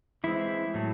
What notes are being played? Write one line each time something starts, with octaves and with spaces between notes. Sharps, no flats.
E3 G#3 C4 E4
A2 F#3 A3